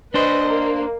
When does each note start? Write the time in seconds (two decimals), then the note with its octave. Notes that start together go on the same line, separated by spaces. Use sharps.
0.14 D4 B4 C5 D#5
0.48 A#3